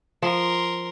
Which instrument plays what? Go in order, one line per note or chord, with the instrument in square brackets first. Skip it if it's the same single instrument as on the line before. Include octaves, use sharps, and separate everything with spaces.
[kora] F3 [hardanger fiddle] A#4 C6